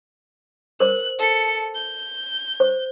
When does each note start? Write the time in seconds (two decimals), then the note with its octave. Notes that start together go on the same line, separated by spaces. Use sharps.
0.80 A#4 C5 F#6
1.19 A4 C#7
1.75 G6
2.60 C5